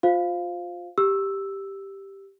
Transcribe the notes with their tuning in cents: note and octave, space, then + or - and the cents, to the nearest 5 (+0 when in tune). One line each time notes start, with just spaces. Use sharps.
F4 +20 C5 +0 F5 +0
G4 +0 E6 +0